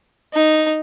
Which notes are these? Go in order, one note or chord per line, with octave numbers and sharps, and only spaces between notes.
D#4